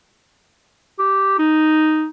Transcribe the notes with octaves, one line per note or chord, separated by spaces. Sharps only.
G4
D#4